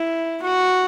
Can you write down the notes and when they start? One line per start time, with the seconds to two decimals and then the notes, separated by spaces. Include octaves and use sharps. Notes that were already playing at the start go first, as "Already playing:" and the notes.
Already playing: E4
0.42 F#4